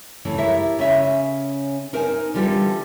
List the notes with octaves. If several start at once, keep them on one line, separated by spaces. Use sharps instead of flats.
C#3 E3 A3
E4 G4 A4 A#4 C#5 E5
C#3 C#4 E5
D#4 A#4 C5 D#5 G#5
D3 E3 G3 F4 G4 A4